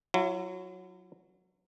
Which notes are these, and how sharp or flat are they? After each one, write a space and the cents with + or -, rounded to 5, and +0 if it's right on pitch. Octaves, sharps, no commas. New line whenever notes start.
F#3 -10 E4 +40